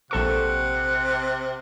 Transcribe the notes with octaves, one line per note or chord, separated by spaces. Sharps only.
A#1 C3 A4 F#5 C#6